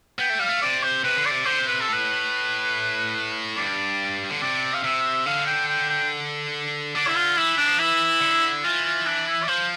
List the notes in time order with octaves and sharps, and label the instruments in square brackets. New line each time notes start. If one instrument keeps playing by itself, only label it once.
[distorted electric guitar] B3 [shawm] G5
[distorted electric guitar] A3
[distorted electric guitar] G3 [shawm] F5
[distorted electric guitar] A3
[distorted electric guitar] C3 [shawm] D5
[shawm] C5
[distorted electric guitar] C3 [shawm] B4
[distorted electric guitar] D3
[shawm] D5
[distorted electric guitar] C3
[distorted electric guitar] D3 [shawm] C5
[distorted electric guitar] C3
[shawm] B4
A4
[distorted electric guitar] A2 [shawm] B4
[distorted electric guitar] G2 [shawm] D5
[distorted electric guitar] D3
[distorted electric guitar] C3 [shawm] D5
[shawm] F5
[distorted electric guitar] C3 [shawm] E5
[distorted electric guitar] D3 [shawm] F5
[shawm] G5
G5
G5
[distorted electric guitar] D3 [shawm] D5
[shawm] E4
F4
[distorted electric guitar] E3 [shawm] E4
[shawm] D4
[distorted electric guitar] F3
[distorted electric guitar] E3 [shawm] E4
[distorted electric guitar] D3
[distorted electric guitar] E3 [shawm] F4
[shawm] F4
D4
E4
D5
[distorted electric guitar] F3 [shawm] C5